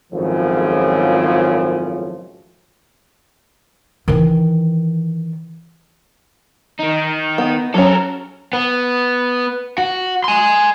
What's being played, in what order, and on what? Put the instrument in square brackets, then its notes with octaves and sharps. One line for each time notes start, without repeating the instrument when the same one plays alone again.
[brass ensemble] G#1 F#2 A2 C#3 F3
[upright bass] D#3 E3
[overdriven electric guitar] D#3 D#4
[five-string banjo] B3
[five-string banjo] F#3 C#4 [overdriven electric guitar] A4 A#4
[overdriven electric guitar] B3
F#4
G#5 C6